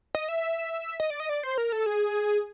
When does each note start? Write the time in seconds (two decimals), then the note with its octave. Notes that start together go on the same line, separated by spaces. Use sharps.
0.15 D#5
0.29 E5
1.00 D#5
1.10 D5
1.20 D#5
1.29 D5
1.43 C5
1.58 A#4
1.72 A4
1.86 G#4